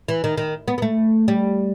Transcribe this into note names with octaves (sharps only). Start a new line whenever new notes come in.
E3
D#3
D#3
B3
B3
A3
G3